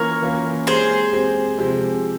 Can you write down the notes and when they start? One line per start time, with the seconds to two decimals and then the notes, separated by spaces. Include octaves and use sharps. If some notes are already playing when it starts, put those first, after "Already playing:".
Already playing: E3 A#3 C#4 F4 A#4 C#5
0.22 E3 A#3 C#4 F4
0.67 G#3 C4 G4 G#4 C5
1.13 G#3 C4 G4
1.58 C3 F3 G#3 C4 G4